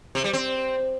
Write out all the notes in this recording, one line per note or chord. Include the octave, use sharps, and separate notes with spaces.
C3
G3
C4